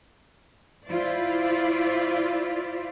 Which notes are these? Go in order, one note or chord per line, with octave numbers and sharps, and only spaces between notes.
E4 F4 C5 D5